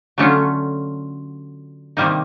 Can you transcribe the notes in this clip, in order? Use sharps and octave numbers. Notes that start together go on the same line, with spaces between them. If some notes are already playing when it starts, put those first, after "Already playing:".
D3 F#3 A3 C#4 F4
C3 D#3 G3 A#3 D#4